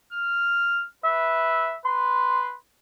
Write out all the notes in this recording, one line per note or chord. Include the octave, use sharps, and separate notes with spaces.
F6
B4 E5
B4 C6